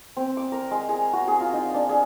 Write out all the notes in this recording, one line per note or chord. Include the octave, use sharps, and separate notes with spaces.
C4
D6
A#4
G#3
G#4
F#4
G#4
F4
D#4
D4
G#4